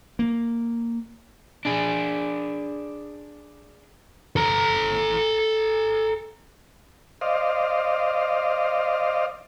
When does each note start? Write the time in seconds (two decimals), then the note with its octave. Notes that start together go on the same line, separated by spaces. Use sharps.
0.19 A#3
1.65 D4 G#4
4.36 A4 A#5
7.21 C5 D5 D#5 F5